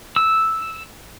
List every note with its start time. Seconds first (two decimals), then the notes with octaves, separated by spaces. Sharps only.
0.16 E6